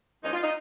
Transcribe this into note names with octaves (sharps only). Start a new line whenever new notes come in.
G2 F3 A#3 C#4 D#4
F4
D#4